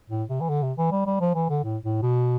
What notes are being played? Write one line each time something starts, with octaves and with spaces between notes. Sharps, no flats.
A2
C3
E3
D3
C3
E3
G3
G3
F3
E3
D3
A2
A2
B2